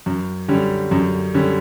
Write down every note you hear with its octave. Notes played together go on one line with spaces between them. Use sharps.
F#2
D3 G3 C#4
F#2
D3 G3 C#4